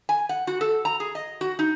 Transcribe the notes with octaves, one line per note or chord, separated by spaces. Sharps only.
G#5
F#5
F#4
A4
A#5
G#4
D#5
F#4
D#4